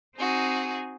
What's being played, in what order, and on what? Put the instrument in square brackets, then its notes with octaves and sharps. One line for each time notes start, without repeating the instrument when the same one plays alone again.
[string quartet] C4 D#4 F#4 G#4